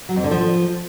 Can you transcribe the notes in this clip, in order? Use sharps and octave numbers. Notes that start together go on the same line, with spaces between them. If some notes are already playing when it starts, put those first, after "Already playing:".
F#3
F2
D3
F3